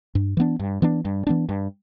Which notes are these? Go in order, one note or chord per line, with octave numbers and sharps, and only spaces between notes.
G2
E3 B3 D4
G2
E3 B3 D4
G2
E3 B3 D4
G2